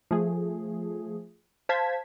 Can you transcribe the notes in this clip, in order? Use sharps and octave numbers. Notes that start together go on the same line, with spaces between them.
F3 A3 G#4
C5 F5 A5 G#6 B6